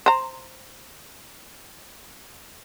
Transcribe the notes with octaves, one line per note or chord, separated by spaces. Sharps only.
C5 A#5